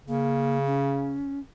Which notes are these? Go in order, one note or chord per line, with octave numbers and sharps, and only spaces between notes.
C#3 A#3
C#4